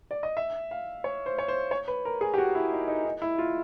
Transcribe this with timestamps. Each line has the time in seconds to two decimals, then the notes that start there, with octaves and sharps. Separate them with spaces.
0.11 D5
0.23 D#5
0.37 E5
0.71 F5
1.04 C#5
1.26 C5
1.39 C#5
1.48 C5
1.71 C#5
1.88 B4
2.05 A#4
2.21 G#4
2.34 G4
2.38 F#4
2.55 E4
2.72 D#4
2.88 D#4
3.05 D#4
3.22 E4
3.38 F4